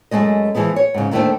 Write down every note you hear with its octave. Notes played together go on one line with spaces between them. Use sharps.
F#2 C3 G#3 A3 D#5
E3 F3 G#3 B3
C#5
G#2 C#3
D#2 D#3 A3 D4 C5 G5